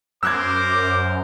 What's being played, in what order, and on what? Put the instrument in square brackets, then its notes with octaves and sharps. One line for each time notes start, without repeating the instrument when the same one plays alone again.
[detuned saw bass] F#2 [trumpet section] A#4 C5 [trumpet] D6 [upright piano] E6 F#6 G#6